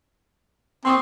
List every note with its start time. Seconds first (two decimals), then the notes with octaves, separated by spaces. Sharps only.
0.85 C4 C6 C#6 D#6